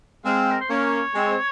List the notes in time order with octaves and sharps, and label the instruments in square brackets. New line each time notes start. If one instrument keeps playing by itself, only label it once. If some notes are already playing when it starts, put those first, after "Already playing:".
[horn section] G#3 C4 [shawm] F5
[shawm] A#4
C5
[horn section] A#3 C#4 [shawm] C#5
[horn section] G#3 C4